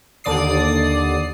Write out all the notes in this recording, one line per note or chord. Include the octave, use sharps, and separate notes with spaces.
D#2 D3 D5 D#6 C7